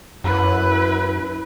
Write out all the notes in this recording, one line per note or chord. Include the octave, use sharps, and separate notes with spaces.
F#2 E4 B4